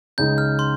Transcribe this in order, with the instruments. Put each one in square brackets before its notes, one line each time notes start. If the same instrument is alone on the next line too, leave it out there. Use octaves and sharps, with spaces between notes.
[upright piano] C#2 C#3 G#3 D#4 [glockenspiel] G6
[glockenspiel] F6
C6